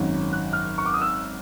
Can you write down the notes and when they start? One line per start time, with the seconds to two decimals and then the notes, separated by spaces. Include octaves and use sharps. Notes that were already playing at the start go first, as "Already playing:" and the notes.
Already playing: G#1 F#2 D#3 F#3
0.32 F#6
0.53 F6
0.78 C#6
0.86 D6
0.93 D#6
1.01 E6